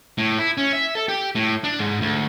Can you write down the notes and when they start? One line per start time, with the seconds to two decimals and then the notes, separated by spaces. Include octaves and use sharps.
0.18 A2
0.39 E4
0.57 C#4
0.73 E5
0.95 A4
1.08 G4
1.35 A2
1.64 D4
1.79 G#2
2.01 D2